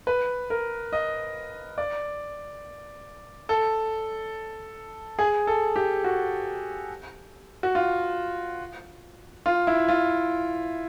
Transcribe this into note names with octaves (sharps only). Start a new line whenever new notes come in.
B4
A#4
D#5
D5
A4
G#4
A4
G4
F#4
F#4
F4
F4
E4
F4